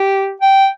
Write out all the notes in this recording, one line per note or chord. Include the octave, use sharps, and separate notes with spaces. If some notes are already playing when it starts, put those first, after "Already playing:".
Already playing: G4
G5